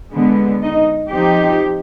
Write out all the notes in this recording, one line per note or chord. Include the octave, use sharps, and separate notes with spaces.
D3 G#3 B3
D#4 D#5
F3 C4 D#4 G4